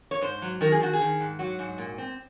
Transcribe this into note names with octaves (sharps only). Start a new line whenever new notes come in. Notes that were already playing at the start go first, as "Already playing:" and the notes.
C#5
G#2 C5
F#3
D#3 A#4
G#4
D#3 F#4
G#4
D#3
G#2
F#3 F#4
G#2
A#2
C4